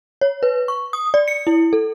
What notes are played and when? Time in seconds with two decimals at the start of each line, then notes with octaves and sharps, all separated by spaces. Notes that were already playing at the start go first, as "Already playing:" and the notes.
0.21 C#5
0.43 B4
0.68 C#6
0.93 D#6
1.14 D5
1.28 C#7
1.47 E4
1.73 A4